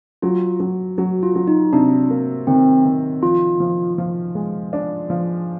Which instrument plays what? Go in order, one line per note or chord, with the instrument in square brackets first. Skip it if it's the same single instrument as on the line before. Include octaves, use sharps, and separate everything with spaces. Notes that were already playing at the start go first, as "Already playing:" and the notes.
[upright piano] F#3 [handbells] F4
[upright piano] F#3
[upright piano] F#3 [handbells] F#4
[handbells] F4
[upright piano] F#3
[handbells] D#4
[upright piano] C3 [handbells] D4
[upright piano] A#3
[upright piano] D#3 [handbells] C4
[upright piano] D#3
[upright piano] F3 [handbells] F4
[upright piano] F3
F3
G#3
D4
F3